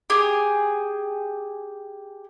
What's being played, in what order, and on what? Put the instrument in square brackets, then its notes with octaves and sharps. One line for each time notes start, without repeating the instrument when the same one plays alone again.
[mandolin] G4 G#4